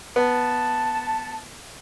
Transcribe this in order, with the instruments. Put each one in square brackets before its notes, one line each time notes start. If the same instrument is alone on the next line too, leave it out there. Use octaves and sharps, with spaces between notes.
[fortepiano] B3 [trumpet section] A5